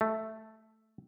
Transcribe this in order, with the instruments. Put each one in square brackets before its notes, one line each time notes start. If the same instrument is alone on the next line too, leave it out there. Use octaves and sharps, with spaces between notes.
[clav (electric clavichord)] A3